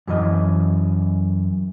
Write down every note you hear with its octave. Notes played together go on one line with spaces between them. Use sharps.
F#2 E3 D#5